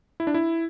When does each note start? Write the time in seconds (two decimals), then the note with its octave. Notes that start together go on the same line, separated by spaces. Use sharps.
0.20 E4
0.27 D4
0.34 E4